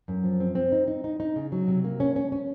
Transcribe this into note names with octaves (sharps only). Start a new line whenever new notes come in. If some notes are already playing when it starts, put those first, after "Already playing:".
F#2
F3
C4
C4
D#4
D#4
D#4
D#4
C#3
F#3
C3
A#3
C#4
C#4
C#4